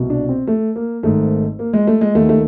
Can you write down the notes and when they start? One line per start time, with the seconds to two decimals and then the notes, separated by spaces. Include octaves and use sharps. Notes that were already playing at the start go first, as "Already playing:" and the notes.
Already playing: C2 B2
0.10 D4
0.29 C4
0.47 A3
0.76 A#3
1.03 G#1 G#2 D#3 A3
1.59 A#3
1.73 G#3
1.87 A3
2.01 G#3
2.15 D#2 D#3 A3
2.29 A3